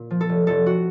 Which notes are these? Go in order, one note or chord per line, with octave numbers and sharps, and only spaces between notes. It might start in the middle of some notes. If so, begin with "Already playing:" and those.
Already playing: A#2
F3
A4
F1
F1 A4
F#4